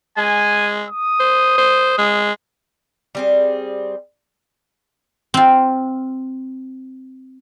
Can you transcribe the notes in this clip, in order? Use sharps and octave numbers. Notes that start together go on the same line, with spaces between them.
G#3 G#5
D#6
C5
C5
G#3
G3 C4 G#4
C4 F4